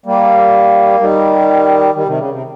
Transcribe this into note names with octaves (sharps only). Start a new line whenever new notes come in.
G3 A#3
D#3 G3
D#3 G3
C3 D#3
C#3
C3